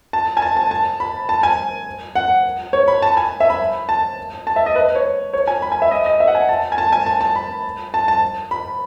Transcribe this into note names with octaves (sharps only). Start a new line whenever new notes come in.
A5
G#5
A5
A5
A5
B5
A5
G#5
F#5
C#5
B5
A5
G#5
E5
B5
A5
A5
E5
D#5
B4
C#5
C#5
G#5
B5
G#5
E5
D#5
D#5
E5
F#5
G#5
A5
G#5
A5
G#5
A5
A5
B5
A5
A5
B5